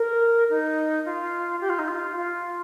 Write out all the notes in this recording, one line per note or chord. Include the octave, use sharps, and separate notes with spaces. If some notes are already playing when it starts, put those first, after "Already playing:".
Already playing: A#4
D#4
F4
G4
F4
D#4
F4
F4